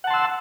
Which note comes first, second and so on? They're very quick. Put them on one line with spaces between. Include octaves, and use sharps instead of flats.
F#5 A5 C6 E6